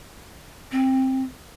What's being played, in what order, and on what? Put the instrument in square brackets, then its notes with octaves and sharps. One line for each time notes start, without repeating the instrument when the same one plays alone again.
[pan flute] C4